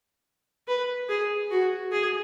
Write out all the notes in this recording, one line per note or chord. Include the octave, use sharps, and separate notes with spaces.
B4
G#4
F#4
G#4